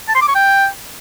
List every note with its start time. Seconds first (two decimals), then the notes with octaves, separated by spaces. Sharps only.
0.08 A5
0.15 C6
0.22 D6
0.28 C#6
0.35 G5